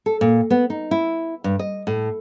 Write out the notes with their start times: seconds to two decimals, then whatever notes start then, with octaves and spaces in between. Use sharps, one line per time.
0.06 A4
0.21 A#2
0.50 B3
0.70 D#4
0.91 E4
1.44 G2
1.59 D#5
1.87 A2